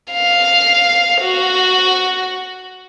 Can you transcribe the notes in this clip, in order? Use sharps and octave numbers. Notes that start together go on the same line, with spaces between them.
F5
F#4